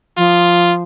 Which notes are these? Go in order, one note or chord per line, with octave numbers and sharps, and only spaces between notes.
F3 F4